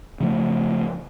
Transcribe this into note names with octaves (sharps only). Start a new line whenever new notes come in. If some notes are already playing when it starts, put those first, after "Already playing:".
C#3 F3 A3